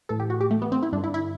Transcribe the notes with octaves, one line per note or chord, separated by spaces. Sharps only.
A2 E3 A4
G4
F#4
G4
A3
B3
C4
E4
G2 D3 D4
E4
E4